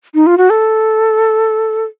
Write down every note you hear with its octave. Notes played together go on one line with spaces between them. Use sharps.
D#4
F4
F#4
A4